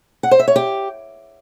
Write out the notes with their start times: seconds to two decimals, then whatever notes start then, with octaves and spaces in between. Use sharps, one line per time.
0.23 F#5
0.31 C5
0.39 E5
0.48 C#5
0.56 G4